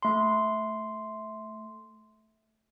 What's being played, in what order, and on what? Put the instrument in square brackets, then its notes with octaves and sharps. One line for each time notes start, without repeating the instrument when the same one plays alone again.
[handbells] A3 C6